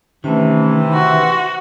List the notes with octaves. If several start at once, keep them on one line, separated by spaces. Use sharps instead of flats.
C3 D#3 E3 A3 C#4
F#4 C6